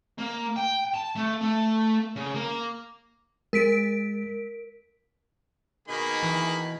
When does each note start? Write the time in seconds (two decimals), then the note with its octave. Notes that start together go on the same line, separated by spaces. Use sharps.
0.18 A#3
0.56 G5
0.94 A5
1.16 A3
1.41 A3
2.16 C#3
2.35 A#3
3.53 G#3 A#4 B6 D7
5.88 B2 D#3 A#3 D#4 G#4 B5
6.23 E3